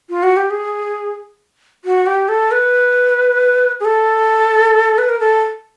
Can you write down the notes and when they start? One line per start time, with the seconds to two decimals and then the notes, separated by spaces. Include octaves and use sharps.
0.09 F4
0.23 F#4
0.36 G4
0.50 G#4
1.85 F#4
2.06 G4
2.28 A4
2.51 B4
3.80 G#4
3.85 A4
4.98 B4
5.09 A#4
5.20 A4